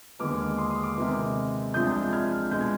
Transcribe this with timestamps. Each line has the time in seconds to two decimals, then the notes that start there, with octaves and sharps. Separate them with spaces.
0.19 D#2 D3 G#3 B3 D6 F6
0.58 C6 D#6
0.70 C6 D#6
0.83 D6 F6
0.97 C3 D#3 G#3 B3
1.74 C2 C3 F3 G#3 D4 D#6 G6
2.13 F6 G#6
2.51 B2 G#3 D4 G6
2.61 G#6